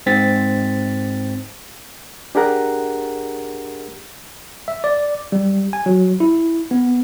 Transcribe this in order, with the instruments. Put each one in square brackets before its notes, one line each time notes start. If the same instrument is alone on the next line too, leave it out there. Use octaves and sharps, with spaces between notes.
[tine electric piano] G#2 C4 A6 B6
[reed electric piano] D4 G4 G#4 A#4 F#5 A#5
[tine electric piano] E5
D5
G3
G#5
F#3
E4
B3